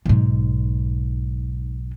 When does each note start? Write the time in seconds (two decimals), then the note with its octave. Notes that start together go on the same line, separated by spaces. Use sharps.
0.06 B1 G#2